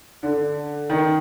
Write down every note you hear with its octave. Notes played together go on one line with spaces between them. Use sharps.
D3
D#3